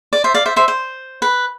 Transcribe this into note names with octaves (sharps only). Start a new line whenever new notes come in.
D5
C5 E5
D5 F5
C5 E5
C5 E5
C5
B4